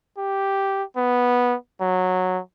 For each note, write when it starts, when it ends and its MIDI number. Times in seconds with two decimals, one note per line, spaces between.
0.18 0.83 67
0.96 1.55 59
1.81 2.40 54